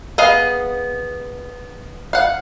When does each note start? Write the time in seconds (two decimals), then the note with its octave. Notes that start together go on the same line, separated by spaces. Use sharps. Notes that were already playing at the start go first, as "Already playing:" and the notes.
0.18 B3 G#4 D#5 F5
2.13 F5 F#5